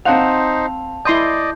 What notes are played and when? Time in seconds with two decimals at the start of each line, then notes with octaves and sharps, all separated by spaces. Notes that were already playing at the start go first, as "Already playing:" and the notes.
0.05 C4 D#4 C5 F5 F#5 A5 F7
1.05 E4 D5 D#5 C6 D#6 G6